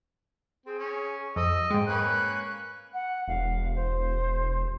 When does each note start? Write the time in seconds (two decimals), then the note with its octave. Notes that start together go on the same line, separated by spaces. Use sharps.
0.66 C4 G#4
0.79 C#4
1.36 F2 D#5 E6
1.70 G#2 G#3 G5
1.86 A#3 C#4 B4 F#6
2.93 F#5
3.28 E1 F5
3.75 C5